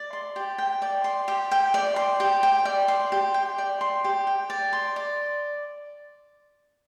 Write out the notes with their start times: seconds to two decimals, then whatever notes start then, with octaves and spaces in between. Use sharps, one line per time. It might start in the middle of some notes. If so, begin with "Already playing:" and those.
Already playing: D5
0.13 C6
0.36 G4
0.58 G5
0.82 D5
1.04 C6
1.28 G4
1.51 G5
1.74 D5
1.96 C6
2.20 G4
2.43 G5
2.65 D5
2.88 C6
3.12 G4
3.34 G5
3.58 D5
3.81 C6
4.04 G4
4.27 G5
4.50 D5
4.73 C6
4.96 D5